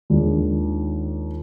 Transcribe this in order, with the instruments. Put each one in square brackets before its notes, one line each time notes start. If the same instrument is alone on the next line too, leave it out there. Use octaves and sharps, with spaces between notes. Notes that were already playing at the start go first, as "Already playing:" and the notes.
[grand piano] D#2 D#3 G#3 D4 F4